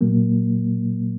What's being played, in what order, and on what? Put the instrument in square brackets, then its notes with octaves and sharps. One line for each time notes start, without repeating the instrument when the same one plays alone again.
[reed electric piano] A#2 F#3 A#3